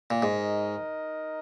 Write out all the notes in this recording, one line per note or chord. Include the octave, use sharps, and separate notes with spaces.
A#2
G#2 D#4 A#4 D#5